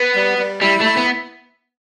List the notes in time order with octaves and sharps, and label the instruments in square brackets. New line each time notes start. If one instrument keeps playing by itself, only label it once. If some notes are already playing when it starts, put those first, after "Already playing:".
Already playing: [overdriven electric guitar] B3
[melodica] G3
G3
[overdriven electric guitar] G3 [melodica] E4
[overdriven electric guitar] A3 [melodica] E4
[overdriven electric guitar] B3